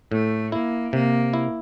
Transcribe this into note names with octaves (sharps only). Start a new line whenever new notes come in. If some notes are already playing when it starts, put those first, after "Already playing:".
A2 A3
A#3 E4
C3 A#3
E4